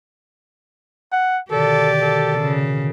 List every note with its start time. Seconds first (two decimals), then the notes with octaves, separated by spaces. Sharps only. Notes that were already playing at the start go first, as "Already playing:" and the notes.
1.12 F#5
1.51 B2 D3 D#3 G4 A4 D5
2.02 A4
2.40 C#3